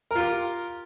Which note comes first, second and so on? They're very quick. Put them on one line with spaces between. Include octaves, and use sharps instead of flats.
A#4 F4 G4